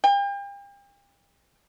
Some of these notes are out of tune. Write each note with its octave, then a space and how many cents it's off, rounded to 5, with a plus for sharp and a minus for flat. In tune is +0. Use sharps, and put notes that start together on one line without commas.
G5 +40